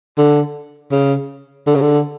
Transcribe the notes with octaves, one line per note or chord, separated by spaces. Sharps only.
D3
C#3
D3
C#3
D3